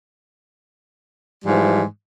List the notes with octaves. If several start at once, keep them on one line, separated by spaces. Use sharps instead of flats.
G#2 E3 F3 G3